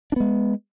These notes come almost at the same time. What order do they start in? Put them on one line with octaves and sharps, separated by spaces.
D4 B3 G#3